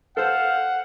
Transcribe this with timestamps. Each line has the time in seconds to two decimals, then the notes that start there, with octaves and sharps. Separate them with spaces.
0.17 A4 C5 F5 F#5